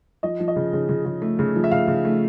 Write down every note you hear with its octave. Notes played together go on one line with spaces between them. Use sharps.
F3 D#5
F3
D#5
C#3
C#3
C#3
C#3
A3
C#3
F3
E5
C#3 F5
C#3
A3